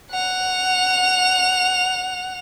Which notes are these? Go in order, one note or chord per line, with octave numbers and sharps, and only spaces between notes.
F#5 F7